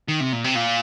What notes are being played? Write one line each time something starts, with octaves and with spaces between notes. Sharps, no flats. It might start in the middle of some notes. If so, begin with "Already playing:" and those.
D#3
C3
A#2
C3
A#2